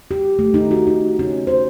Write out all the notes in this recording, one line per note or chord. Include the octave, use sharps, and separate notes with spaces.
G4
A3
D#4
F#4
D#4
C#4
C5